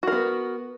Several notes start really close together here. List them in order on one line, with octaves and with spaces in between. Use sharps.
F#4 A#4 B3